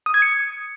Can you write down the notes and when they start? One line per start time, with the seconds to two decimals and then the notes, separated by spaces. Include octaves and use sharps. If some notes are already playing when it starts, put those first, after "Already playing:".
0.06 D#6
0.14 G#6
0.22 C#7